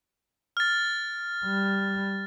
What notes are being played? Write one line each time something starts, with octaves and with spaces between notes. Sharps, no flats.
F6 A6
G3